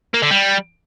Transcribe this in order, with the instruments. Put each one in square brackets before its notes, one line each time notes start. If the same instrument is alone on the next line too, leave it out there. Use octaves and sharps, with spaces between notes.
[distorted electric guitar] A#3
D3
G3